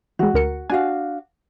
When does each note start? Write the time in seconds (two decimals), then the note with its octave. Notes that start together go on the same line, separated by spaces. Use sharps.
0.19 E3 G#3 F#4
0.34 D2 A#4 C#7
0.70 D4 F#4 F5 G#5